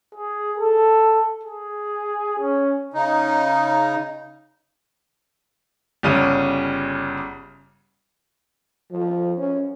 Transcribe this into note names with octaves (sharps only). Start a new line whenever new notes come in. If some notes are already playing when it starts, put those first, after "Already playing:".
G#4
A4
G#4
C#4
C#3 D#4
G1 C#3 G3 C#4 D#7
F3
C#4